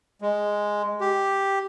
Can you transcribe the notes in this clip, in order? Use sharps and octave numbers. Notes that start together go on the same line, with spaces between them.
G#3
G4